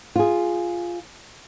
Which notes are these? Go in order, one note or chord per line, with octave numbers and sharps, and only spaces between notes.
F4 G#4